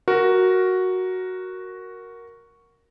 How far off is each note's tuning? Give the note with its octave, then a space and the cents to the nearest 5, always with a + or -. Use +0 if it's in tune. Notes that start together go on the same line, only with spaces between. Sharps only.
F#4 +0 A#4 +0